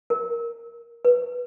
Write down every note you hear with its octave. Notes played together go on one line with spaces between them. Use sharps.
A#4
B4